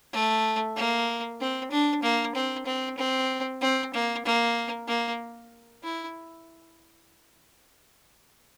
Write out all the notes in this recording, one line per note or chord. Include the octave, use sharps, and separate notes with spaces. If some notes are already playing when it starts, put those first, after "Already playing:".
A3
A#3
C4
D4
A#3
C4
C4
C4
C4
A#3
A#3
A#3
E4